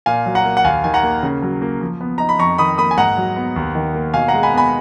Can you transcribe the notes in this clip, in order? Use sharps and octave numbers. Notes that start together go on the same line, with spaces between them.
A#2 F5 G#5
F#3
F#5 A#5
A#3
F#5
D#2 F5 G#5
D#3 G#5
F#5 A#5
A#3
C#3
F#3
A#3
F3
B3
D#4 A#5
B5
F2 A#5 C#6
D#3 B5 D#6
A#3 B5 D#6
G#5
G#2 F#5 A#5
F#3
B3
D#2
D#3
A#3
B2 F5 G#5
F#5 A#5
G#3
G#5 B5
B3 G#5 B5